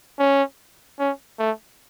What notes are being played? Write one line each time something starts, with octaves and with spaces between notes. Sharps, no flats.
C#4
C#4
A3